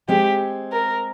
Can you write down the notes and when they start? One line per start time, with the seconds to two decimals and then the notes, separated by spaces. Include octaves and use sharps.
0.09 G#3 C4 G4
0.72 A#4